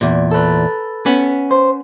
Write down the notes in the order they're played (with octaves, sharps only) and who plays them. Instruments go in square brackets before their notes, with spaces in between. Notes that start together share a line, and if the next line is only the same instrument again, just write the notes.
[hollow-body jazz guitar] E2 A#2
[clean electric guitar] A4 B4
[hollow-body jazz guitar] B3 C#4
[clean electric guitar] C5